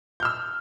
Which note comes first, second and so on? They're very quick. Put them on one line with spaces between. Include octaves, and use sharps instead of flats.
G6 F6 E6